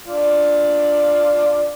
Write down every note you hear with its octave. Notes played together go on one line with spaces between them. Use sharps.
D4 F4 D5